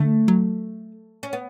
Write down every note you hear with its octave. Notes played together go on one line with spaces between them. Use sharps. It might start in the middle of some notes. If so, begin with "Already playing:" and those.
Already playing: D3 A3
F#3
C#4
B3